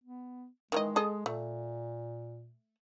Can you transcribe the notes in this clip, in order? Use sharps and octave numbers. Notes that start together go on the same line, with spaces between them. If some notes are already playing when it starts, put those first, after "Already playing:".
B3
D#3 E3 G#3 D#5
G#4 A4 D#5
A#2 A3